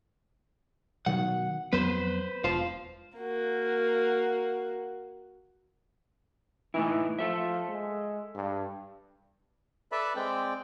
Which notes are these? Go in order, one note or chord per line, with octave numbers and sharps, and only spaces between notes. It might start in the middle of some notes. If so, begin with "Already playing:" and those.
B2 D#3 F#3 F#5
F2 F#3 B3 B4 C5
E1 F4 C5
A#3 F#4
E3 A3 D#4 E4
F3 A4 E5
G#3
G2
A4 B4 D5 E5 A5 B5
G#3 C4 D5 G5